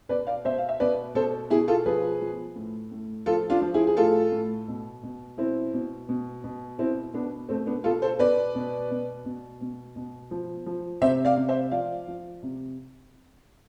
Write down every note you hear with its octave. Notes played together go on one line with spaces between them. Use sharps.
B2 B4 D5
D5 F5
B2 C5 E5
F5
E5
B2 B4 D5
B2 A4 C5
B2 E4 G#4
F4 A4
F3 G#4 B4
F3
A2
A2
F3 F4 A4
D4 F4
F3
E4 G#4
G#4
A2 F4 A4
A2
B2
B2
B2 C4 E4
B2
B2
B2
B2 C4 E4
B2 B3 D4
B2 A3 C4
B3 D4
B2 F4 A4
A4 C5
B2 B4 D5
B2
B2
B2
B2
B2
F3
F3
C3 C5 E5
D5 F5
C3
C5 E5
F3 D5 F5
F3
C3